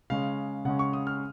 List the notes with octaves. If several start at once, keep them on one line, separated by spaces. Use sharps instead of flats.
C#3 G#3 C#4 F5
C#3 G#3 C#4 F#5
C#6
D#6
F6